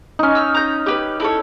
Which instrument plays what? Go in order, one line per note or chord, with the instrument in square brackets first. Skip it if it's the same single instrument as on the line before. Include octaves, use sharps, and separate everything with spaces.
[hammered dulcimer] C#4 D#4
[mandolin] E6 F6
A#5 G6
G4 B4
E4 A4 C#5